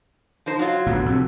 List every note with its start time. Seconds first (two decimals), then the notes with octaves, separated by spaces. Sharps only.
0.46 F3 D#4 C5
0.59 F#3 F4
0.87 A1 D2 B2
1.06 F2 C3